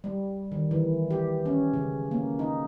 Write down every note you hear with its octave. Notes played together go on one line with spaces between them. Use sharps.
G3
D#3
E3
G4
C#4
C#3
A#3
D#4